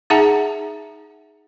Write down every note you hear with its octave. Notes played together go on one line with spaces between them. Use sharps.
D#4 G#4 E5 F#5 A5 A#5